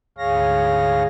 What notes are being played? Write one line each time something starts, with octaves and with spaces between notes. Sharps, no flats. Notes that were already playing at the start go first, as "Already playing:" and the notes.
D2 G#2 G#4 C#5 F5 A#6